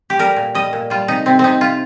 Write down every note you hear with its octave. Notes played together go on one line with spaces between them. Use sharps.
G4
G3 A#4
A#2
G3 D#5
A#2
G3 F4
C3 D#4
C3 C4
C3 C4 D#4
C3 F4